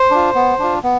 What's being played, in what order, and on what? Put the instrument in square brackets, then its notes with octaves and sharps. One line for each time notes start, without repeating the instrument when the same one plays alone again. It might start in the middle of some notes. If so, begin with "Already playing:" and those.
Already playing: [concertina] C5
D4 F4
B3
D4 F4
B3